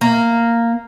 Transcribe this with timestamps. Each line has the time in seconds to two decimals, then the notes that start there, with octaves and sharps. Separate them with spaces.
0.01 A#3